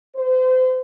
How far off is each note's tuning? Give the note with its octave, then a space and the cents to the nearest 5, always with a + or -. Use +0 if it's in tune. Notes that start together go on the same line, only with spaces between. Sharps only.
C5 -35